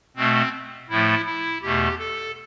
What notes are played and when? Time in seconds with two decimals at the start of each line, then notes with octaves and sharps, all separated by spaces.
0.16 B2 A3 C4
0.90 A2 F3 A3 E4
1.26 E4
1.62 E2 B2 A3 G4
1.99 A4